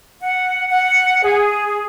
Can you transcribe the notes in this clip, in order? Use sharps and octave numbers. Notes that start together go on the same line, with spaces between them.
F#5
F#5
G#4